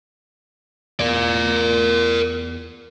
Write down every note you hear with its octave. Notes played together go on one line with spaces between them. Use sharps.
E2 A#4 D5